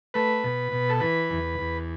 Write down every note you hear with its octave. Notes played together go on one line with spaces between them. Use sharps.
A3 B4
B2
B2
A4
E3 B4
E2
E2